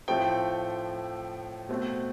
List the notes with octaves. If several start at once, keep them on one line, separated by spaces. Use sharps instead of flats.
A2 F3 A3 C4 G5
B2 A3 C4